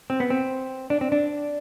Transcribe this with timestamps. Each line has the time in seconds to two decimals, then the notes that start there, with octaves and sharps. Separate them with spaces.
0.10 C4
0.20 B3
0.30 C4
0.90 D4
1.01 C4
1.12 D4